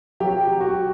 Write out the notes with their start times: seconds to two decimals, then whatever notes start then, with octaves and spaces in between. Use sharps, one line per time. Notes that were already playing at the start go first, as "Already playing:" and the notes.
0.20 F#3 G4
0.48 F#3
0.61 F#4